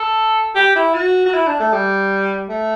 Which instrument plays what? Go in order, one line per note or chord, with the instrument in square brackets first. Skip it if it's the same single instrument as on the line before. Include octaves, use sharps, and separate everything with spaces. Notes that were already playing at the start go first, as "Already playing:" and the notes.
Already playing: [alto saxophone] A4
G4
E4
F#4
F#4
E4
D4
A3
G3
A3